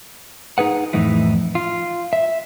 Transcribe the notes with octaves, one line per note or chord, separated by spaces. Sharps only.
D#4 G#4 B4 F#5
F2 A2 E3 D#4 E4
F4
E5